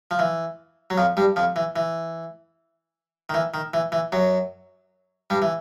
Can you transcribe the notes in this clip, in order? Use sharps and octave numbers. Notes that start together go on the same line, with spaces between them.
F3
E3
F#3
F2 F3
G2 G3
F2 F3
E3
E3
D#3
E3
D#3
E3
E3
F#2 F#3
G2 G3
E3